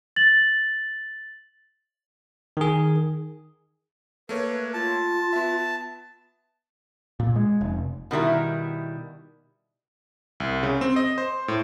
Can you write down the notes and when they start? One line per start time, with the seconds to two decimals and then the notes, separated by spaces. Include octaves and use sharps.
0.16 A6 F#7
2.57 D#3 G#4
4.29 A3 A#3 B4 C#5
4.74 F4 A5
5.33 B3 E5
7.20 A#2
7.36 G#3
7.61 F1
8.11 B2 D#3 G3 E4
10.40 C2
10.63 C#3
10.81 C4
10.96 D#5
11.18 C5
11.48 A2